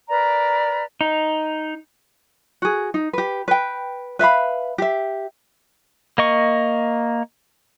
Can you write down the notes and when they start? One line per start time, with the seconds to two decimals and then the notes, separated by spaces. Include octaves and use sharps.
0.08 A#4 B4 D5 A#5
1.01 D#4
2.62 F#4 G#4
2.94 D#4
3.13 G4 B4
3.48 B4 G5
4.19 B4 E5 F5 B5
4.78 G4 E5
6.18 A#3 D#5 C#6